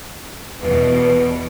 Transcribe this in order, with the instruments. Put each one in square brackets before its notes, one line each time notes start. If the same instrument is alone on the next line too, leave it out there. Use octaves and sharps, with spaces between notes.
[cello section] E2 B2 [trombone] B4